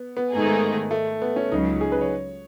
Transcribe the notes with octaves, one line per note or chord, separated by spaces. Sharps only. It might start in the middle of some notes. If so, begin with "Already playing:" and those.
Already playing: B3
B3
G#2 D#3 A3 D#4 G#4
A3
B3
C#4
C#2 C#3 F#3 D#4
G#4
B4
C#5